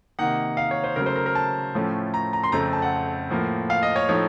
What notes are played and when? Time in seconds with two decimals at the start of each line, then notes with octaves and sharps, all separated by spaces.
0.19 C3 D#3 A#3 D#4 F#5
0.57 F5
0.71 C#5
0.84 C5
0.96 C#3 F#3 A3 A#4
1.06 C5
1.16 A#4
1.26 A#4
1.35 A5
1.75 A2 F3 A3 C#4
2.14 A#5
2.33 A#5
2.44 C6
2.52 F2 C#3 A3 C4 A#5
2.73 A5
2.82 F#5
3.30 A2 F3 A#3
3.70 F5
3.83 D#5
3.96 C#5
4.09 A2 F3 A3 D#4 C#5